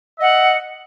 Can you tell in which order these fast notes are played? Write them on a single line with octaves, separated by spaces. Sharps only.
E5 D#5 F#5